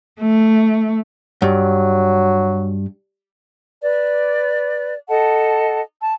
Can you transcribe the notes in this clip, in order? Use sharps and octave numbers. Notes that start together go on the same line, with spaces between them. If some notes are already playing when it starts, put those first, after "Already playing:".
A3
G2 F#3
B4 D5
A4 D#5 F#5 A5
A5